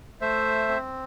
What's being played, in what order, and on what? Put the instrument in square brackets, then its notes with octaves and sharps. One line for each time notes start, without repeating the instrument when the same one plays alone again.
[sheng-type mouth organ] A3 C5 E5
C4